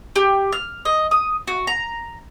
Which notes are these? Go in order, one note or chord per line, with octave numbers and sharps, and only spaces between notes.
G4
F6
D#5
D#6
F#4
A#5